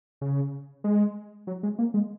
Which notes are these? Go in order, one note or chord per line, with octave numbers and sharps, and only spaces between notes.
C#3
G#3
F#3
G#3
A#3
G#3